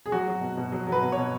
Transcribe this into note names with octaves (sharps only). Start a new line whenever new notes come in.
G#4
F#3 F#4
F#3
B2
B2
F#3
F#3
B4
B2
B2 C#5